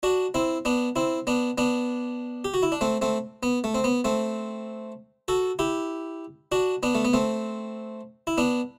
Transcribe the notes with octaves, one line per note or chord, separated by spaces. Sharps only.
D4 F#4
C4 E4
B3 D4
C4 E4
B3 D4
B3 D4
G4
F#4
E4
D4
A3 C4
A3 C4
B3
A3
C4
B3
A3 C4
F#4 A4
E4 G4
D4 F#4
B3 D4
A3
B3
A3 C4
E4
B3 D4